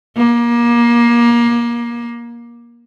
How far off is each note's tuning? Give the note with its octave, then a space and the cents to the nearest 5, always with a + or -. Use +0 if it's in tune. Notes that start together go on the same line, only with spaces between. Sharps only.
A#3 +25